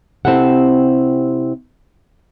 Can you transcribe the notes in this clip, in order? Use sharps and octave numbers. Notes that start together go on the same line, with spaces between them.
C3 C4 E4 G4 A4 F#5